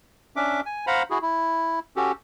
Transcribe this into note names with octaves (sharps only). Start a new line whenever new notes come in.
C#4 D4 E5 D6
G#5
C5 F5 F#5 A#5 B5
E4 F#4 G#4
E4
C#4 F#4 G4 A4